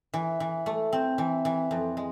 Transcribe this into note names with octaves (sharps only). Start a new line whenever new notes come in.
E3
E3
A3
C4
E3
E3
F2
G#3